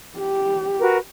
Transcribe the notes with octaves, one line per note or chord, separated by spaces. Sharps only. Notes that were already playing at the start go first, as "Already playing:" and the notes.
G4
F#4 A#4 B4